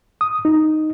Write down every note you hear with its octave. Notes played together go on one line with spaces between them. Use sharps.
D#6
D#4